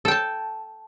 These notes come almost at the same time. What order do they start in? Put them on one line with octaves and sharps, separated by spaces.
A4 G5 A5